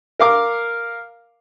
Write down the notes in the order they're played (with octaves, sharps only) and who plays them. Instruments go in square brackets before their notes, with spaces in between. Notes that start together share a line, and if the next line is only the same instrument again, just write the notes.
[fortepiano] A#4 F5 D6